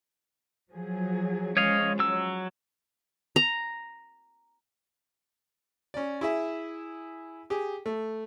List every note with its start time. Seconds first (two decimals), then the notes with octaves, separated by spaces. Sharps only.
0.70 F3 F#3 G#4
1.57 F3 G#3 C#4 C#5 D#5 F5
1.99 F#3 E6
3.36 A#5
5.94 C#4 D5
6.21 E4 G#4 E5
7.50 G4 G#4
7.86 A3